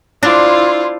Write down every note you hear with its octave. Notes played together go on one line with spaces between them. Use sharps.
D4 E4 F4 C5